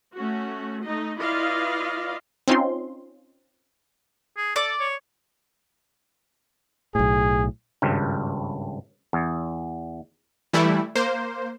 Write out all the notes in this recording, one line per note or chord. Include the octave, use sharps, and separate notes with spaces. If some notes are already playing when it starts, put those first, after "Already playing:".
A3 C#4 F#4
A3 D#4 D#5
E4 F4 B4 D5 D#5 F5
C4 C#4 D#4 F4 C6
G#4
A4 D5
C#5
B1 A2 G#4
G#1 C#2 G2
E2
E3 G3 A3 E4
A#3 C5